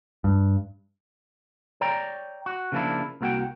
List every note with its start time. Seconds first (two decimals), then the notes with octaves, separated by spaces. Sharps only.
0.24 G2
1.81 C#5 D5 G5 A#5
2.46 F#4
2.72 C#3 F3 A#3 C4 D4 E4
3.21 C2 A#3 B3 F#4 F#5 G5